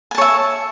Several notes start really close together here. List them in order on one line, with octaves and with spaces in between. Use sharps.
G#5 A5 C#5 E5